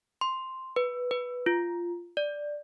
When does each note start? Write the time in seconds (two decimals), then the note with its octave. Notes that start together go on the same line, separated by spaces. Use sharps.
0.21 C6
0.76 B4
1.11 B4
1.46 F4
2.17 D5